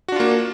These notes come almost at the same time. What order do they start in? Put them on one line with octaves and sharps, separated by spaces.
F#4 D4 F4 A#3